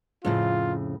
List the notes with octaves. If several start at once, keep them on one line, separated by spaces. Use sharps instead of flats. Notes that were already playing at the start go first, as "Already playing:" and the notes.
F2 A2 C#3 F4